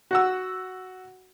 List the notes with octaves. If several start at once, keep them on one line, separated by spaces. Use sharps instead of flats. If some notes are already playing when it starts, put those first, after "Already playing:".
F#4 F#5 E6